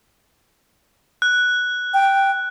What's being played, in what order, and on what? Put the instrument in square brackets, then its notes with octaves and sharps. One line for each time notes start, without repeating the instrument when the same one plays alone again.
[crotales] F#6
[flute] G5